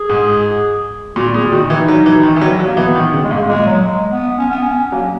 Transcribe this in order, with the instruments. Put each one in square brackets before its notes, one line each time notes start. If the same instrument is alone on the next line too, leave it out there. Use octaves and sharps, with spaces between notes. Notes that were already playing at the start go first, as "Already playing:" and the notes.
Already playing: [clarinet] G#4
[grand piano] G#2
[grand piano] A#2 [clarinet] F#4
[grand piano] A#2 [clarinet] G#4
[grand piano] D#3 [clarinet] F#4
[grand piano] E3 [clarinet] D#4
[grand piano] F#3
E3
D#3
E3
F#3
F#3
[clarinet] A#3
[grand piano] E3 [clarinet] B3
[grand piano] D#3
C#3
[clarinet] G#3
[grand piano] G#2 [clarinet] A#3
[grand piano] A#2 [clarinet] G#3
[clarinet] F#3
G#3
B3
C#4
B3
C#4
[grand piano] F#3 [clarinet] A#3